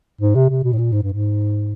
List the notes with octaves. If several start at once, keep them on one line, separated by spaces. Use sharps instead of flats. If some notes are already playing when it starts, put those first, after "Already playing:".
G#2
C3
C3
B2
A2
A#2
G#2
G2
G#2